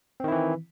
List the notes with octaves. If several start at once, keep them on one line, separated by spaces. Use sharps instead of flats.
D#3 E3 C4 E4